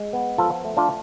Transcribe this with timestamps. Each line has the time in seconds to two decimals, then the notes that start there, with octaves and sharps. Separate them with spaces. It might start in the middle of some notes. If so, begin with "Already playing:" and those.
Already playing: G#3
0.13 B3
0.38 F3 F4 A4
0.65 A3
0.77 D4 F4